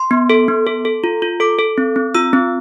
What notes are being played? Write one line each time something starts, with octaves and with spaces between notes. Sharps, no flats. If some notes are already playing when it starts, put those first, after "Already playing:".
Already playing: C6
B3
A4
B3
A4
A4
F4
F4
A4 D6
A4
C4
C4
F4 E6
C4